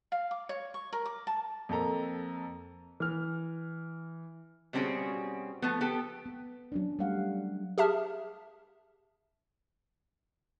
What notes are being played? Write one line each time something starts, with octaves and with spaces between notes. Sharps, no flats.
F5
D6
C#5
C#6
A#4
D6
A5
F2 A#3 A4 A#5
E3 F6
B2 G3 C4 C#4 F#4 G#4
F3 A3 B3
B3 G4 A4
B3
F#3 C#4 D4
G3 A3 C#4 G4 F5 F#5
G4 G#4 E5 A5 F6